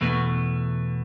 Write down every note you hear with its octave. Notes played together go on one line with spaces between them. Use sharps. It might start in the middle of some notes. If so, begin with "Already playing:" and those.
E2 B2 A3